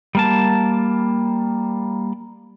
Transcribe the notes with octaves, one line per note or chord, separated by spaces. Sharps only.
G3 A#3 A5